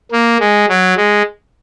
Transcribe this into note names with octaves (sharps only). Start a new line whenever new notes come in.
A#3
G#3
F#3
G#3